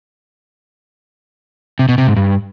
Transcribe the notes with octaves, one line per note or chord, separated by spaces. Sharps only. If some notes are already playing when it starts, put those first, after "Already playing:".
C3
B2
C3
G#2
G2